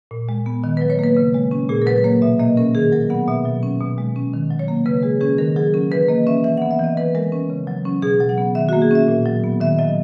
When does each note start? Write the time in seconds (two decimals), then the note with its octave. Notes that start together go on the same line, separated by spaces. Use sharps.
0.11 A#2
0.29 G#3
0.46 B3
0.63 D#3 D#5
0.77 B4
0.81 F#3
0.90 C#5
0.99 A#3 B4
1.17 C#3
1.34 G#3
1.51 C#4
1.69 A#2 G#4
1.82 A#4
1.87 F#3 B4
2.04 A#3 C#5
2.22 B2 E5
2.39 A#3 D#5
2.57 C#4 A#4
2.74 D#3 G#4
2.92 F#3 A#4
3.10 B3 F#5
3.28 B2 E5
3.45 F#3
3.63 C#4
3.80 B2
3.98 G#3
4.16 C#4
4.33 D#3
4.51 F#3
4.59 C#5
4.68 A#3
4.86 C#3 B4
5.03 G#3 G#4
5.21 C#4 G#4
5.38 D#3 A#4
5.56 F#3 G#4
5.74 C#4 A#4
5.91 E3 B4
6.09 A#3 D#5
6.27 C#4 E5
6.44 E3 E5
6.57 F#5
6.62 B3
6.71 E5
6.80 E3 D#5
6.97 E3 B4
7.15 G#3 A#4
7.32 C#4
7.50 C#3
7.67 F#3
7.85 C#4
8.02 B2 G#4
8.20 F#3
8.29 F#5
8.38 B3
8.55 D#3 E5
8.69 F#4
8.73 A#3
8.82 G#4
8.91 C#4 E5
9.08 A#2
9.26 F#3
9.43 B3
9.61 D#3 E5
9.79 F#3 D#5